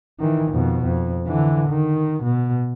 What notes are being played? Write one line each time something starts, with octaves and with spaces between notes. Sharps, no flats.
D#3 E3
F2 B2
F2
D3 E3
D#3
B2